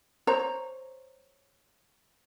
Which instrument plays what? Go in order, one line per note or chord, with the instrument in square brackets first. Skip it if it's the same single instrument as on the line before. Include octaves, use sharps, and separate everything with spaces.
[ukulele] C5 C#5 A#5